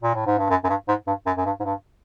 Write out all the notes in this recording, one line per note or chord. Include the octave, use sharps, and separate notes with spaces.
A#2
A2
G#2
G2
F#2
F#2
G2
G#2
G2
F#2
F#2
G2
G#2
G2